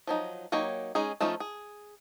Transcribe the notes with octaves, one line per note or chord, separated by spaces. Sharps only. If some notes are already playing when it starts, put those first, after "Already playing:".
F3 F#3 D#4
F#3 A#3 D#4 G4 C#5
G#3 C#4 D#4 G#4
F3 A3 C#4 D#4 F4
G#4